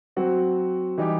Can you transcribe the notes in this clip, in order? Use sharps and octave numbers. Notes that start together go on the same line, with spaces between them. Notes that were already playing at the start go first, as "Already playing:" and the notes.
F#3 C4 F#4
E3 G3 D#4 G4